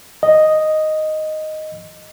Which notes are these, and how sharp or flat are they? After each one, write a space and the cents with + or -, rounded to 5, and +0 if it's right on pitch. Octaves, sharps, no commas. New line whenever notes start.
D#5 +0